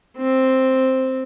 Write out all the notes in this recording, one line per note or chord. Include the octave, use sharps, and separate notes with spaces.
C4